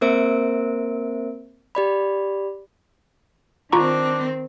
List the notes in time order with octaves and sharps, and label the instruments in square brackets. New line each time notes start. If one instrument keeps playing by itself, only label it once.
[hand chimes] A#3 C4 A#4 C5 E5 D7
G4 D5 B5
[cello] D#3 C4 [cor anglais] D4 [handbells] F4 A#5 C#6